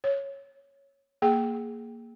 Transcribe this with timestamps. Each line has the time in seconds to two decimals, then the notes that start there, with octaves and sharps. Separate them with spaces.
0.04 C#5
1.22 A#3 G#4 G5